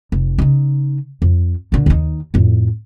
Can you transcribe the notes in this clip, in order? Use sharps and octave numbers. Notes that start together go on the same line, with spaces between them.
F1
C#3 D#4
F2
A#2 D3
D#2 D#4
F2 A2